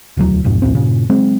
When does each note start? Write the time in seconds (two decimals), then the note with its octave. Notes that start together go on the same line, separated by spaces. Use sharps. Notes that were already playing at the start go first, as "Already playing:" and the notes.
0.17 E1 D2 F#3
0.44 B1 F2 G#2
0.62 A#1 D#2 A2 C4
0.75 G2 A#2 C#3
1.10 C#3 F#3 G#3 C4